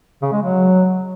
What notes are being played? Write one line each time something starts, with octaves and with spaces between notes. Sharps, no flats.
C#3
G#3
F#3